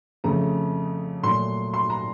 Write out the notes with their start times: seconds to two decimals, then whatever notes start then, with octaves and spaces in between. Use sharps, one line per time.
0.24 F2 C#3 A3 A#5
1.23 A#2 F#3 A3 C6
1.74 C6
1.90 A#5